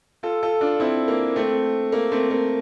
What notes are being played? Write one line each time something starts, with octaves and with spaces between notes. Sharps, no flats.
F4 A4
F4 A4
D4 F4
C4 E4
A#3
A3 C4
A#3
A3 C4
A#3